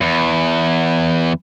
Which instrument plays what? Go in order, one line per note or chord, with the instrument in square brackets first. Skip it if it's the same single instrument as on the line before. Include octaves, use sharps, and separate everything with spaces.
[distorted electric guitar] E2